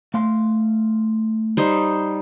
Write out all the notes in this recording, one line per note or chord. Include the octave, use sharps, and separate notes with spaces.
A3 F5 C6
G3 D#4 C5